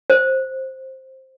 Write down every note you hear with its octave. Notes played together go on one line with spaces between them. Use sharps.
C5